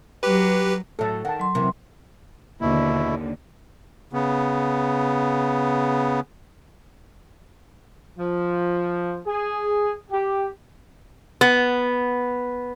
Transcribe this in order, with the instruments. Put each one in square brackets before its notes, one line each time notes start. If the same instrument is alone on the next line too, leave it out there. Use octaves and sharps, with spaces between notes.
[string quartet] F#3 [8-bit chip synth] G4 B4
[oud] A2 F#3 [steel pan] A4 E5 A5
[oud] D#3 [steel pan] F#5 G5 A5
[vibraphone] F#3 C6
[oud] C3 E3 A#3
[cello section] D#2 D3 [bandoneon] B2 E4
[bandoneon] C#3 B3
[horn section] F3
G#4
G4
[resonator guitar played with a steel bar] B3